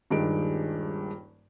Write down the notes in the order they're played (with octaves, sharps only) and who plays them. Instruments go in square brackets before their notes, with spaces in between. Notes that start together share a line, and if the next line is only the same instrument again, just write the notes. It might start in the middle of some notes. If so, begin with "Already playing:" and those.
[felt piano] D#1 G2 D#3 G#3 D7